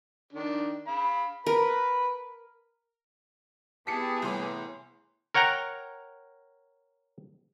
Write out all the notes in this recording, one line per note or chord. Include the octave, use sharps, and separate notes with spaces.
D#3 D4
F5 B5
A#4 B4 B5
B3 E4 G4 G#4 A5 D#6 B6 C#7
C2 A2 E3 C6 D6
A#4 C#5 F#5 G5 A#5